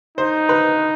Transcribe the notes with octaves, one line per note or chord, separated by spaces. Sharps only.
D#4 C5
B4